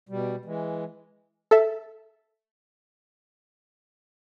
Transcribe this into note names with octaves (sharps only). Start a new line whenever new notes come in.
B2 G3
E3 G#3
A4 E5